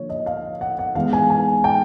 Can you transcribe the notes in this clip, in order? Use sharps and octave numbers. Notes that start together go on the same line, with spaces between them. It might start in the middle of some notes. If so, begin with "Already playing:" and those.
Already playing: D3 F3 A#3 C#5
D#5
F5
F#5
F#5
E3 G#3 B3 F5
G#5
G#5
G5